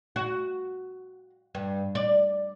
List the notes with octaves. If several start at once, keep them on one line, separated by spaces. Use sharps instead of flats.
F#4
G2
D5